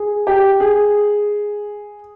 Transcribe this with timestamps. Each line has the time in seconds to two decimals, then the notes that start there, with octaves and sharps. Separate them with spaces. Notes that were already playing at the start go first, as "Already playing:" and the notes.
Already playing: G#4
0.27 G4
0.60 G#4